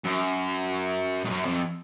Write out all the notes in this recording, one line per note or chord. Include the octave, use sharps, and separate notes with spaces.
F#2
G#2
F#2
F2